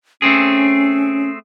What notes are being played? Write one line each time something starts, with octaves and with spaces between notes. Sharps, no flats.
A3 C4 C#4 G#4